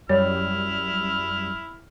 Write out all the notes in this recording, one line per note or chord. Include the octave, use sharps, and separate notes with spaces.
F#2 G3 E4 C#5 F6